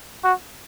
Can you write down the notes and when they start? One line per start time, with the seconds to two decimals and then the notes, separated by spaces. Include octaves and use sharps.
0.24 F#4